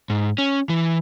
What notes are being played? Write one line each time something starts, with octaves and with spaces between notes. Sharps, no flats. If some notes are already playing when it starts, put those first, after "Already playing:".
G#2
C#4
E3